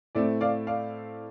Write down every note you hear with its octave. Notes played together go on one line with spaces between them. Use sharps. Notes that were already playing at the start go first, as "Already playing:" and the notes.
A2 A3 C4 D5
D5 F5
D5 F5